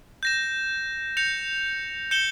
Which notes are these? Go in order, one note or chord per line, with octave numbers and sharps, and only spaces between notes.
G6 A#6 E7
G6 A#6 C#7 F7
G6 C#7 E7 G7